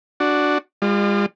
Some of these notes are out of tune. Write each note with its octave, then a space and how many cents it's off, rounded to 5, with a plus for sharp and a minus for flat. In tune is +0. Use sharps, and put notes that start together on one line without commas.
D4 +0 F#4 +0
G#3 -45 F4 +0 D5 +45